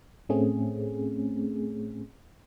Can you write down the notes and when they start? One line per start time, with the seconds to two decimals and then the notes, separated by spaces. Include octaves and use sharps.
0.29 A2 A3 C4 C#4 G#4